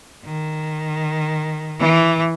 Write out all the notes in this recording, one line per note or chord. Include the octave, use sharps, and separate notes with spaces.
D#3
E3